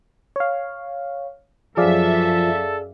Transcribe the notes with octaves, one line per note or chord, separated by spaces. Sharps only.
C#5 F5
F#2 F3 G#4 A4 D5 E5 F5